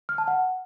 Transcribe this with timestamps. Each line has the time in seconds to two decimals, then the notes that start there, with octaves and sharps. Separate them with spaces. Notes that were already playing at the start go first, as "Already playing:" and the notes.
0.09 F6
0.18 A5
0.28 F#5